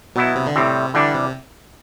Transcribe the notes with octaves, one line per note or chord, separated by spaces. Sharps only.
B2 F#3 B3 E4
C3
D3
A2 C3 G3 C4
D3 E3 G3 D4
C3